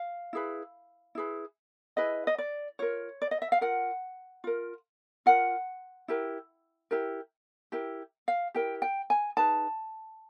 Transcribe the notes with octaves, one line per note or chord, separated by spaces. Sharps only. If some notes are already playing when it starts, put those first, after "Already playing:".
Already playing: F5
E4 G#4 B4
E4 G#4 B4
E4 G#4 B4 D#5
D#5
D5
F4 A#4 C#5
D5
D#5
E5
F5
F4 A#4 F#5
F4 A#4
F4 A#4 F#5
E4 G4 A#4
E4 G4 A#4
E4 G4 A#4
F5
E4 G4 A#4 G5
G5
G#5
D#4 G#4 B4 A5